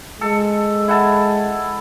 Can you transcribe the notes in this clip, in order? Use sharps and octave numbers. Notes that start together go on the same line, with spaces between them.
G#3 A4
E4 F#5 A5